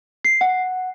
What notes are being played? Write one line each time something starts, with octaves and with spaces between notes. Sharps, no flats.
C7
F#5